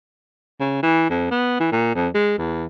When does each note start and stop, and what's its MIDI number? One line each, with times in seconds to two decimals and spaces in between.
0.60 0.81 49
0.82 1.08 52
1.10 1.30 41
1.31 1.57 59
1.60 1.67 52
1.72 1.94 46
1.95 2.08 41
2.15 2.33 56
2.38 2.65 40